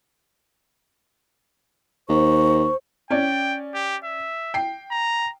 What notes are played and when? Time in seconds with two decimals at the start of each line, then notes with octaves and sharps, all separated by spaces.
2.09 D#2 C5 C#6
3.10 C#4 D5 G5
3.74 G4
4.04 E5
4.54 G5 C7
4.91 A#5